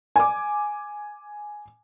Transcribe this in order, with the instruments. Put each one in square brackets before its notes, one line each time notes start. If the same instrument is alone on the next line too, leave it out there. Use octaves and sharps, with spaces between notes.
[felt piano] G#5 D6